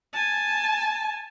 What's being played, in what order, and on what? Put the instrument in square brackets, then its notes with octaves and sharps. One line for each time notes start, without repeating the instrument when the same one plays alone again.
[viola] G#5 A5